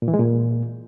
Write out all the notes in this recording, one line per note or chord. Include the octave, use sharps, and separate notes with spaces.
A#2
E3
G#3
A#2